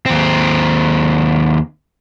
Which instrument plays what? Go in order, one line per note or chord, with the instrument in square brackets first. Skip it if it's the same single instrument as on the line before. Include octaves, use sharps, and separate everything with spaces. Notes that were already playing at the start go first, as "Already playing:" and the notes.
[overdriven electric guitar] D#2 C4